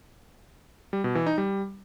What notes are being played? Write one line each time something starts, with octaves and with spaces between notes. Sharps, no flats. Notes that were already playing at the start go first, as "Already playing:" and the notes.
G3
B2
E3
D#4
G3